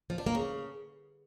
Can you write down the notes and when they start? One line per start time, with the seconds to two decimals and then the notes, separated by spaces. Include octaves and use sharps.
0.10 F3
0.18 D4
0.26 A#3
0.35 C#3